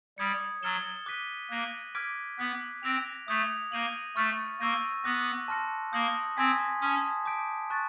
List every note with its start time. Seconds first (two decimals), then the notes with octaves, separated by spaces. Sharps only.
0.18 G3 D#6 G#6 C#7
0.63 F#3 F6 A6 C#7 E7 G7
1.06 D6 F#6 B6 D#7 G7
1.50 A#3 F#6 A#6 D#7 F#7
1.95 D6 F6 G#6 B6 D7
2.39 B3 D6 F#6 B6
2.83 C4 F#6 A#6 D7 F7
3.28 A3 D#6 G#6 C#7 F7
3.72 A#3 G6 A#6 D#7 F#7
4.16 A3 C#6 F6 A6 C#7
4.60 A#3 C#6 E6 G6 A#6 D#7
5.04 B3 D6 F#6 A#6
5.48 A5 C6 F6 A#6 C#7
5.93 A#3 D#6 G6 A#6 C#7 F#7
6.37 C4 G#5 C6 D#6 G#6 B6
6.81 C#4 A5 C6 D#6
7.25 A5 D6 G6 B6 D7
7.70 A5 C#6 F#6 A6